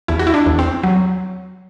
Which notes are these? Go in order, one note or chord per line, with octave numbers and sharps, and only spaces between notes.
E2 E4
F#4
E4
D4
E2
C4
F#3